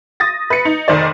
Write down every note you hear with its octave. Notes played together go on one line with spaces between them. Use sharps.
D#6 A6 A#6
B4 C#7
D#4
F1 D#3 C5 D5